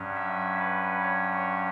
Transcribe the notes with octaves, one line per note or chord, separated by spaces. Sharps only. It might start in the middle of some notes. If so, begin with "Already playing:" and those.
Already playing: G2 F#3 C#4
E5
B4
C#5
C#5